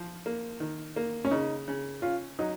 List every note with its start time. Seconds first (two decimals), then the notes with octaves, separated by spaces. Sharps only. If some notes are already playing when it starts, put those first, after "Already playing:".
Already playing: F3
0.26 A#3
0.60 D#3
0.96 A#3
1.25 C#4
1.31 C#3 D#4
1.68 C#3
2.02 C#4 F4
2.39 F#3 D#4